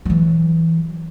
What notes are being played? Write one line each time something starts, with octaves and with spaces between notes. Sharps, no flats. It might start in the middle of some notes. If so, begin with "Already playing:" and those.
E3 F#3